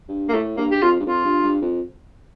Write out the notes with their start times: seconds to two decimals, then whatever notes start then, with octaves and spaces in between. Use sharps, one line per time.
0.08 G2
0.29 A#3
0.33 A2 A3
0.57 G2 A#3
0.71 G4
0.82 F2 F4
1.00 G2
1.06 F2 F4
1.24 G2
1.43 G2
1.61 F2